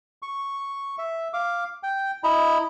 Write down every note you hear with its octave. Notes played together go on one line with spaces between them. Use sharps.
C#6
E5
F5 D6
G5
E4 D#5 A#5 B5